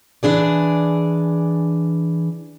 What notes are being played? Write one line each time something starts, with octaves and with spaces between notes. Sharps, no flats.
E3 D4 G#4 D5